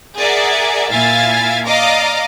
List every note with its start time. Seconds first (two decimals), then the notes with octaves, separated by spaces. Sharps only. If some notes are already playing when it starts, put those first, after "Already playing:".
0.17 G#4 A#4 D5 E5 F#5
0.91 A#2 E4 E5 F5 G#5 A6
1.66 D5 D#5 F5 A#5 D6